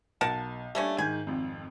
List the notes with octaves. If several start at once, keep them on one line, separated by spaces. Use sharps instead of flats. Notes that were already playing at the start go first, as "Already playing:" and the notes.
B1 A#4 F#5 A5
G3 A3 A#3 C#4 D4
G#2 D#3 G#5
G#1 F2